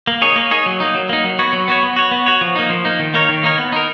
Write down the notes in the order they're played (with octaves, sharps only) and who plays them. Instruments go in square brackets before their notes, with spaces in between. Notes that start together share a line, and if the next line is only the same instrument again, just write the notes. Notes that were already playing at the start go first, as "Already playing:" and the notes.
[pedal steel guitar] A#3
D#4 G#4 C#5
A#3
D#4 G#4 C#5
F#3
A#3 D#4
F#3
A#3 D#4
F#3
B3 F#4 C#5
F#3
B3 F#4 C#5
B3
F#4 C#5
B3
F#4 C#5
F3
A#3 D#4
F3
A#3 D#4
D#3
A#3 D#4 A#4 C#5
D#3
A#3 D#4 A#4 C#5
B3
D#4 A#4